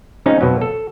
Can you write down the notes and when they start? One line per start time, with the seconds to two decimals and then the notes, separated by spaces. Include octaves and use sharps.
0.26 F3 G#3 C4 C#4 D#4
0.41 F2 B2 F3 F#3
0.61 A4